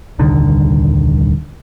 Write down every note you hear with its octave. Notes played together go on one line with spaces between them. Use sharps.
D#1 C2 D3 D#3